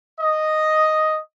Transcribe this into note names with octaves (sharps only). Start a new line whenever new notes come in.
D#5